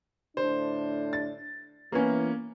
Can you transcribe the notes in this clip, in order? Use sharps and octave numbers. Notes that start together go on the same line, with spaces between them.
A2 D3 D4 C5
A6
E3 A#3 B3 C#4